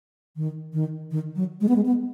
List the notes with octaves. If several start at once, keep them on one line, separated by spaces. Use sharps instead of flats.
D#3
D#3
D#3
F#3
G#3
B3
G#3
B3